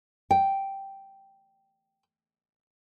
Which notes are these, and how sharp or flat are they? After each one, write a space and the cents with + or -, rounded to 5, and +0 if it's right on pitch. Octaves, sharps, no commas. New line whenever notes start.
G5 -5